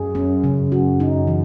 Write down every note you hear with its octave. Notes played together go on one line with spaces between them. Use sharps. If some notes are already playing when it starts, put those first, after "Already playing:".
Already playing: F#2 G#4
C#4
C#3
F#2 F#4
D#4
E3